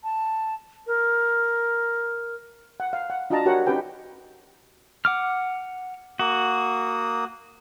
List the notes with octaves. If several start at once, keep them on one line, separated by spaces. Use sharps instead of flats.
A5
A#4
F#5
F5
F#5
D4 F4 F#4 D#5 A5 A#5
F#4 G4 A#4 C#5 F5 F#5
C#4 D#4 G4 B4 G5 G#5
F#5 D6 F6
A#3 F#4 D#6